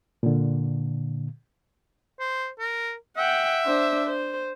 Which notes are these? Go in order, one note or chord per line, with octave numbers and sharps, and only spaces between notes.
A#2 D3
C5
A#4
E5 F#5 G5
D4 C5
C5